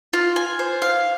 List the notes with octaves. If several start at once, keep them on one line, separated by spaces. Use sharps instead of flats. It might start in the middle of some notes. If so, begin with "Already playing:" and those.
F4
G#5
C5
F5